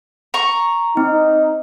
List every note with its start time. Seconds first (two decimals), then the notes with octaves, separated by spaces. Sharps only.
0.34 A#5 C#6
0.97 C4 D#4